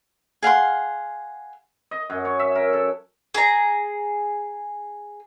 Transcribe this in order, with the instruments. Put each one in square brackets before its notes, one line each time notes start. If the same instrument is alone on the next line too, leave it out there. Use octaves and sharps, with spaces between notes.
[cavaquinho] G#4 F5 F#5 C6
[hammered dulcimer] D#5
F#2
C#5
E5
A#4
A4
[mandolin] G#4 A#5